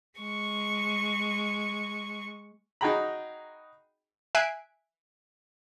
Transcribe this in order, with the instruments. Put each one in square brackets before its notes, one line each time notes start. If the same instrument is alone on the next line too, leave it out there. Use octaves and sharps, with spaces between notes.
[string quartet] G#3 C#6
[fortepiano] D#4 F#4 G#4 G5 A#5 B5
[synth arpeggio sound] E5 G#5 F#6 B6 C7 D7